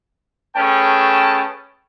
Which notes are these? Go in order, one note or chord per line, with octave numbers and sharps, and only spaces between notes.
A3 C#4 G#4 B4 G5 A5